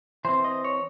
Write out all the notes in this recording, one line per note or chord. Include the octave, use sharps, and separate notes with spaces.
E3 C4 C5
D#5
C#5